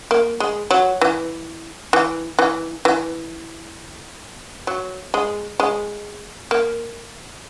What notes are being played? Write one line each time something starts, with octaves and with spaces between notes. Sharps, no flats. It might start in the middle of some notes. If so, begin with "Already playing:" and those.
A#3
G#3
F#3
E3
E3
E3
E3
F#3
G#3
G#3
A#3